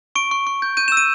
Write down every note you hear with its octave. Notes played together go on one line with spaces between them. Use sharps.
C#6 D7
C#6
C#6
G6
G6 D#7
E6 E7
D#7